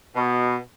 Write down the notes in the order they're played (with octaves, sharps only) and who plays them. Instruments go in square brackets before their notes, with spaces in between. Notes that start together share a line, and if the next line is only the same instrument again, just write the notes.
[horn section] B2